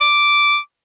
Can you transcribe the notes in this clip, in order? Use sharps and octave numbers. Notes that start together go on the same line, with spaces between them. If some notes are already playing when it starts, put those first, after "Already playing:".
D6